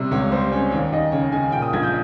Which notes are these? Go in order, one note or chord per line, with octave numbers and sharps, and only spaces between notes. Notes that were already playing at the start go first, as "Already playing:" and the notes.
Already playing: C3 G3
C#2 C#5
G3 C5
C#4 C#5
D#2 C#5
D#2 D#5
C#3 C#5
C#3 G#5
A#2 G5
D#6
A#1 G#6
G6